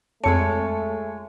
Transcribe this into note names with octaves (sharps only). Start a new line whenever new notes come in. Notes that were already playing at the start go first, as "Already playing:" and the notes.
F2 G#3 A3 F4 C#5 A5 C#7